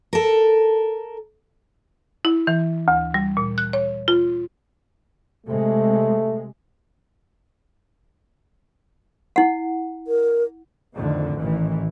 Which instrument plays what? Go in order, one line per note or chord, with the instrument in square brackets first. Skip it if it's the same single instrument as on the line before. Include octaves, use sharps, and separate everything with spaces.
[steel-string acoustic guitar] A4 A#4
[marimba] E4
E3
D2
G3
A#2
F#6
C#5
F4
[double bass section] C3 G#3 [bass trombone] A3
[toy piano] E4 F#5
[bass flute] A#4
[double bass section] F2 A2 D3 D#3
A1 D#3 E3